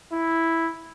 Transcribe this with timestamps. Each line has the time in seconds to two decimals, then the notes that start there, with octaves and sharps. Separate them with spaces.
0.13 E4